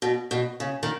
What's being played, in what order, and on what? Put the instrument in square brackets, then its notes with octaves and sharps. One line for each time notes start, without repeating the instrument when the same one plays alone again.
[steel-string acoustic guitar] B2
B2
C#3
D#3